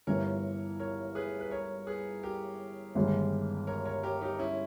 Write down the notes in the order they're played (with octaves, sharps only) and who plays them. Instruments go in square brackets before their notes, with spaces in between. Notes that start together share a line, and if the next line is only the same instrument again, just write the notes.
[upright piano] G1 G2 E3 [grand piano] A#4 C#5
[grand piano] A#4 C#5
G#4 B4
B4
A#4 C#5
G#4 B4
G4 A#4
[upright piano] G1 G2 D#3 G#3
[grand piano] A#4 C#5
A#4 C#5
G4 A#4
D#4 G4
C#4 E4